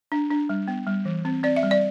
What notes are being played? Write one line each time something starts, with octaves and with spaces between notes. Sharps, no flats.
D4
D4
G3
B3
G3
E3
C4
C4 D5
E5
G3
D5